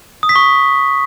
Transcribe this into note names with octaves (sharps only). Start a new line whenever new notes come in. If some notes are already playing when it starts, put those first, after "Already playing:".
D#6
B6
C#6